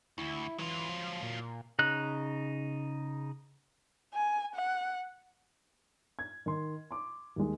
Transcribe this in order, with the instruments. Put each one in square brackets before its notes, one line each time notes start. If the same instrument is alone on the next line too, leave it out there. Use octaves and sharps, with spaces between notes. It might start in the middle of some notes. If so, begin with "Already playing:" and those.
[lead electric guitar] D2 [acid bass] E4
[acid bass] E3 [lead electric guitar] F#3 F4
[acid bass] F3
A#2
[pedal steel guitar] C#3 D#4 F#6
[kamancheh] G#5
F#5
[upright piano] G#6
D#3 C6
C6 D6
D#2 G#3